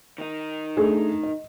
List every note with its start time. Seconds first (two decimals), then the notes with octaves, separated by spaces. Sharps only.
0.18 D#3 D#4
0.77 A3 D4 G#4
1.23 D#5